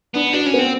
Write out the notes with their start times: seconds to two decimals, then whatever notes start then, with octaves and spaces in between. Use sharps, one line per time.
0.14 B3 D4
0.33 D4 F#4
0.46 C#4
0.54 B3
0.59 C4